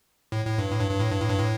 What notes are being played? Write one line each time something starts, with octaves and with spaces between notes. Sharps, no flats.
A2
A2
G2
A2
G2
G2
A2
G2
A2
G2
A2